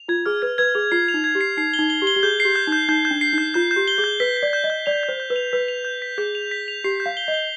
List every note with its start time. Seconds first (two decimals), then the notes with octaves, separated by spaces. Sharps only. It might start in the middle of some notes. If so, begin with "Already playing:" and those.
Already playing: F7
0.08 F4 G#6
0.26 G#4 F6
0.42 B4 G#6
0.58 B4 G#6
0.75 G#4 F7
0.92 F4 C7
1.08 F7
1.14 D#4
1.24 G#6
1.35 G4
1.41 C7
1.57 D#4 C7
1.74 G7
1.79 D#4
1.90 G7
2.02 G4
2.07 G7
2.16 G4
2.23 G#4 G6
2.40 G4 C7
2.55 G6
2.67 D#4
2.72 G6
2.88 D#4 G6
3.05 G6
3.11 D4
3.21 C7
3.33 D#4
3.38 G6
3.54 F4 G6
3.71 G6
3.76 G4
3.88 G7
3.98 G#4
4.04 G6
4.20 B4 B6
4.37 B6
4.43 D5
4.53 G6
4.64 D#5
4.70 G6
4.86 D5 F7
5.03 G6
5.09 C5
5.20 G6
5.30 B4
5.36 F7
5.52 B4 B6
5.68 F7
5.85 G6
6.02 B6
6.18 G#4 G6
6.35 F7
6.51 B6
6.68 F7
6.84 G4 C7
7.00 G6
7.06 F5
7.17 G7
7.28 D#5
7.34 G7